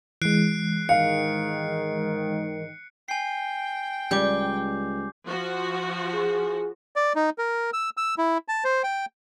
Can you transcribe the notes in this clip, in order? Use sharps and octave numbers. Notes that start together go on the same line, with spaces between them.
E3 G#3 F#6 C7 D7
G#2 D#3 F5 C#7
G5 G#5 C7
C#2 G3 D6 G6
F3 F#4
G#4
D5
D#4
A#4
E6
E6
E4
A5
C5
G5